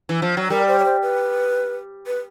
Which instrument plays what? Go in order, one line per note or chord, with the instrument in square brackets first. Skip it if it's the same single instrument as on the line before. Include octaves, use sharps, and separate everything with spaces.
[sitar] E3
F3
F#3
[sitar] G3 [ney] A#4
[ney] C5
C#5
C5
B4
B4